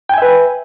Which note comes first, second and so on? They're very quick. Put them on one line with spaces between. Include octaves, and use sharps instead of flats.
G5 G#5 E5 B4